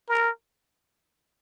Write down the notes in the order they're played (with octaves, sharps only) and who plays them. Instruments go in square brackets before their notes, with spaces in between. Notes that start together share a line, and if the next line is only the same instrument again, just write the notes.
[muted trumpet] A#4